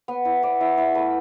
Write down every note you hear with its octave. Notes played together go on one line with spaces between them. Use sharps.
B3
E4
B3 D5
E4 E5
E4 E5
A3 B4